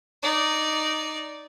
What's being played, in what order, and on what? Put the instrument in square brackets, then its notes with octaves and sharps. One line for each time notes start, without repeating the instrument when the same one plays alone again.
[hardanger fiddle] D#4 D5